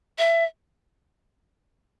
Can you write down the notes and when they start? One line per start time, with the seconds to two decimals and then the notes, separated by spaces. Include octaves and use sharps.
0.19 E5